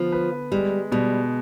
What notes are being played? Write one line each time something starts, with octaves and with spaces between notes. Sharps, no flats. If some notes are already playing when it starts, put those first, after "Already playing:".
Already playing: D3 F3 B3
B4
G3 G#3
B2 G3